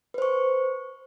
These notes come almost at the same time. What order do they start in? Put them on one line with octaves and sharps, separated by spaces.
B4 C5 C#6